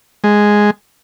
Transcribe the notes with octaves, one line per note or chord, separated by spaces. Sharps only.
G#3